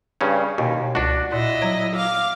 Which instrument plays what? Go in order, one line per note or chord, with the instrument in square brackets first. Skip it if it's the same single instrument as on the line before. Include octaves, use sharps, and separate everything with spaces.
[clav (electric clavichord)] G2 C#3 C#4
[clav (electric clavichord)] D#2 [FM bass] B2
[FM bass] C#2 [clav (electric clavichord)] D4 F#4
[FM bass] A#2 [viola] E4 D#5
[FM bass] F#3
[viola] F5 D6